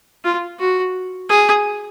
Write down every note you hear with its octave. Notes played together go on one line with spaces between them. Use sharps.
F4
F#4
G#4